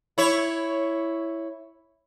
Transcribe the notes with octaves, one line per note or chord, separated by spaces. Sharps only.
E4 C#5